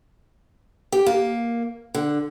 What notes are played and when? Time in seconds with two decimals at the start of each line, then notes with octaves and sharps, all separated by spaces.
0.92 G4
1.06 A#3
1.94 D3